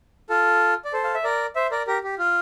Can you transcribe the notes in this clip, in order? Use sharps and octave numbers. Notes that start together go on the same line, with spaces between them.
F4 A4
D5
A4 C5
F5
E5
A#4 D5
C5 E5
A#4 D5
G4 A#4
G4
F4